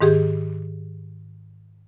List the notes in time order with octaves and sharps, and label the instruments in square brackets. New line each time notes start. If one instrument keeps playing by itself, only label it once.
[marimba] G#2 D#3 G4 G#4